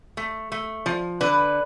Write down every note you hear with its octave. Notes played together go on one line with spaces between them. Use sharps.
A3
A3
F3
D3 B4